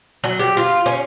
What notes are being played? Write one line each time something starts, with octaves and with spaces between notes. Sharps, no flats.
F#3
G4
F4
C#4